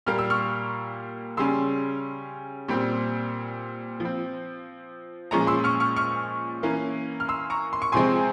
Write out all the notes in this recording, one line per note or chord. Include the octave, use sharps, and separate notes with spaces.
A#2 G3 A#3 F6
E6
C#6 F6
C#3 G3 C#4 C6 E6
A#2 G3 C4
F3 C4
A#2 F3 G#3 C#4 A#5 C#6
C6 E6
C#6 F6
C#6 F6
C#6 F6
E3 A#3 C#4
F6
C6 E6
A#5 C#6
C6
C#6
C3 F3 G#3 C4 G#5 C6